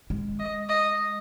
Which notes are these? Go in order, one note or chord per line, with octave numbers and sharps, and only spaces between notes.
G#3
D#5
D#5